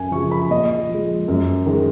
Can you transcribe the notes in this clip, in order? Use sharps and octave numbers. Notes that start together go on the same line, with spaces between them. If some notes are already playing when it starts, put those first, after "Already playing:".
Already playing: F#2 G#5
C#3 F3 C#6
B5
A#2 D#5
F3 G#3
F#2
D#3 G#3